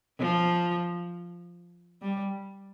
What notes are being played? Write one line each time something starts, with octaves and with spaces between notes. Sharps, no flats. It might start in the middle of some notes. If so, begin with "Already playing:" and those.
F3
G3